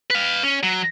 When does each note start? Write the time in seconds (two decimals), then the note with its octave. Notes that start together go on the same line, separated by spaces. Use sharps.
0.10 B4 F5
0.43 C#4
0.63 F#3